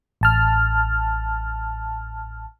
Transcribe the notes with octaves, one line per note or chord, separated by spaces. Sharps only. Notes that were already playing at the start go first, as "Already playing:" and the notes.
A1 A5 F6